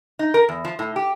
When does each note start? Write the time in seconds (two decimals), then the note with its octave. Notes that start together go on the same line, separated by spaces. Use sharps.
0.19 D#4
0.34 A#4
0.49 E2
0.65 F3
0.79 A2
0.96 G4